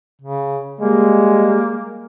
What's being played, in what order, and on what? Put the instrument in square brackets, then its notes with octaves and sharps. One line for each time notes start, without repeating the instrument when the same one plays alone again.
[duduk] C#3
[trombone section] G3 G#3 [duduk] A#3